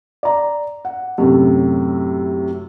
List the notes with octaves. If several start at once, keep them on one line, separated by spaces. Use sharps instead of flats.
D5 A#5
F#5
F#2 A2 C3